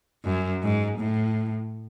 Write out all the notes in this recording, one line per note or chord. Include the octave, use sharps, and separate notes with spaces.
F#2
G#2
A2